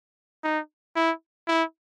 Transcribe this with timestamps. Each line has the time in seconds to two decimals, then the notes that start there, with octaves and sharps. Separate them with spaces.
0.44 D#4
0.96 E4
1.48 E4